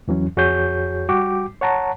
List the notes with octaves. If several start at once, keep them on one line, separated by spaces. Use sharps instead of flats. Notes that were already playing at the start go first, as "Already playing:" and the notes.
E2 E3 F#3 C#4
F2 F#4 G#4 C#5 G6
G3 F#4 G5 D6
C#5 F#5 A5 A#5